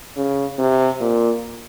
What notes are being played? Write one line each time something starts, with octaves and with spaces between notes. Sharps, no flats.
C#3
C3
A#2